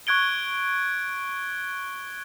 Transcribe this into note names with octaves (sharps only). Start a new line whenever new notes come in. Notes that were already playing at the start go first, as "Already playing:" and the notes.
C#6 F#6 G#6 D7 G7